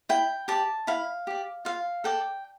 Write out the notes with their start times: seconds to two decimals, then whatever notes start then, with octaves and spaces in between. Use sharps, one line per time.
0.09 E4 G5
0.48 G4 D5 A5
0.87 E4 F5
1.27 G4 D5
1.65 F4 F5
2.04 A4 D5 G5